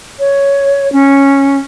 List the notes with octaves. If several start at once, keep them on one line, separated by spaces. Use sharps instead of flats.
C#5
C#4